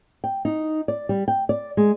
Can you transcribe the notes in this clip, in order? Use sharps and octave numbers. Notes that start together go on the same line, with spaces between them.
G5
D#4
D5
G3
G5
D5
G#3